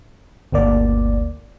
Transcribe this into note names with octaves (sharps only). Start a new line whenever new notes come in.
G1 D2 A#3 D5